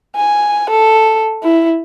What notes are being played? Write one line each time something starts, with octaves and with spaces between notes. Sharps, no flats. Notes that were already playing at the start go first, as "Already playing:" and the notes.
G#5
A4
E4